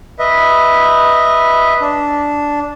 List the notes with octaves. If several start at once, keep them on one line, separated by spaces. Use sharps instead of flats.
B4 D#5 E5
D4